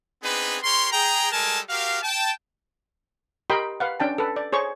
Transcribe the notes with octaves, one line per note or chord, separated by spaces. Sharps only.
B3 C4 D4 D#4 G#4 B4
G4 A#4 C#5 C6
G#4 G5 A#5
G3 G#3 A4 A#4 G#5 A5
F#4 G4 A#4 F5
G5 A5
G4 A#4 D#5 G5 B5 C6
B4 F5 F#5
C#4 D4 G5 A5
A4 B4
D5
G#4 C5 C#5 C#6